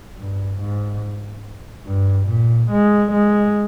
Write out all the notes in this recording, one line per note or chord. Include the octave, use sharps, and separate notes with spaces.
G2
G#2
G2
A#2
G#3
G#3